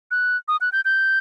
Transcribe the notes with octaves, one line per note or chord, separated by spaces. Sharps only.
F#6
D#6
F#6
G6
G6